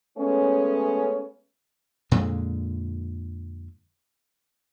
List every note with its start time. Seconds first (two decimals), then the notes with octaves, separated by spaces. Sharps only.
0.18 G#3 A3 B3 C#4
2.11 F2 A#2 D3 G#3